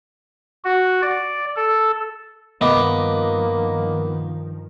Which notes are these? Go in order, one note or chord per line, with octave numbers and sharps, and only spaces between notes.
F#4
D5
A4
G2 D#3 F3 A#3 B3 D#5 D6